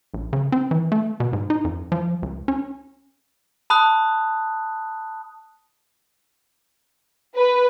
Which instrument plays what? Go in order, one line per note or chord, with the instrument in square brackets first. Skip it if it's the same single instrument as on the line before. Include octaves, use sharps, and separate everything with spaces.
[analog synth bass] A#1
C#3
C4
E3
A3
B2
G#2
D#4
F2
F3
C#2
C#4
[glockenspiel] A5 B5 D#6 F#6
[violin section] B4